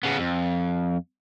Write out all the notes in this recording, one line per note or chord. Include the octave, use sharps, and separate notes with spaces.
C#3 B3
F2